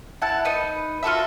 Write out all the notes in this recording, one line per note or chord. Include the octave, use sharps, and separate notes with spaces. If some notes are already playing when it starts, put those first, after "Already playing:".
E4 F#5 A5
D#4 B4 D#6
F4 F#4 A4 E5